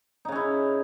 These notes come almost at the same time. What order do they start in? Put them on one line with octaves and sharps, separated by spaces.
D#4 C#3 C#4 E4